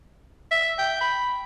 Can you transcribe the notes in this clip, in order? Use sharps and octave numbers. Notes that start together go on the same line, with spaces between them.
E5
G5
B5